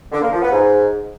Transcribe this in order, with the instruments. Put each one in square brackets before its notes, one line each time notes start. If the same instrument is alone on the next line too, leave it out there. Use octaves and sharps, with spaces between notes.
[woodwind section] D3
A#3
F3
B3
G#2